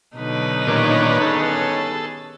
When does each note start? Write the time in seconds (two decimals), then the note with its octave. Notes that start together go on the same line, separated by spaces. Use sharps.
0.17 B2 D3 F#3 D#4 B4
0.67 G2 A#2 D#3 C#4 D4 C#5
1.21 D#3 B3 G#4 A4